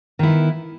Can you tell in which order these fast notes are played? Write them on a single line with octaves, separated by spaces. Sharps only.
D#3 E4 B3